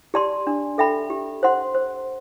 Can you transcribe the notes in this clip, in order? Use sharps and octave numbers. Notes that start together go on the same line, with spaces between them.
G4 D5 A5 C6
D4
A4 E5 G5 B5
G4
C5 F#5 C6
C5